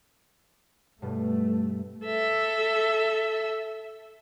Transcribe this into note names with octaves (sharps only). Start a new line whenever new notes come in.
G2 B2 A3
A4 E5